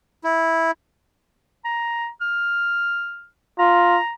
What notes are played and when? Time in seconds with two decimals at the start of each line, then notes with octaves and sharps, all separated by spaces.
0.24 E4
1.65 A#5
2.21 F6
3.59 F4 A#5